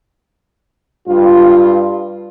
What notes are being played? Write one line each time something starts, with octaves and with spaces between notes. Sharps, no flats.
G2 F4